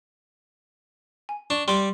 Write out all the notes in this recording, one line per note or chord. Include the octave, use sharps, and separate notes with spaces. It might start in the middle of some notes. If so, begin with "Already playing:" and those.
G#5
D4 C#6
G3 C6 D6